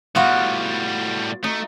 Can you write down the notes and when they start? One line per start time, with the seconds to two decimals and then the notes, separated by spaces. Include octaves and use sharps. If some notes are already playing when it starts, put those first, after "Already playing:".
0.15 A2 G3 B3 F4 F#4
1.44 A3 D#4